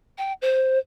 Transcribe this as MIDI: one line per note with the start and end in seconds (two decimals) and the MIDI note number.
0.18 0.33 79
0.42 0.78 72